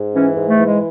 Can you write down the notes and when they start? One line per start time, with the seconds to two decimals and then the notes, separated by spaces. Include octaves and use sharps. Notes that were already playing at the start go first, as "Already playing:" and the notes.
Already playing: G#2
0.14 E3 C#4
0.37 G#2
0.49 A3
0.60 E3
0.65 G#3